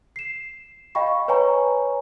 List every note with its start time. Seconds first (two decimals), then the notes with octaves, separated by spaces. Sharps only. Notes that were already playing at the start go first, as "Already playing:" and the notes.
0.16 C7 E7
0.95 D#5 F5 G5 B5 C#6
1.28 B4 C#5 G5 G#5 A#5 C#6